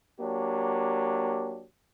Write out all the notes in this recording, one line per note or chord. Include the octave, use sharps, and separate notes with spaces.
F#3 A#3 D4 G4